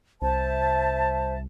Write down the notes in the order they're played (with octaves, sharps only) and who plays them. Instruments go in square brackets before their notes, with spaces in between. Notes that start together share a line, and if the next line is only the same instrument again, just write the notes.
[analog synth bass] C2 [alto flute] C5 [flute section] E5 A5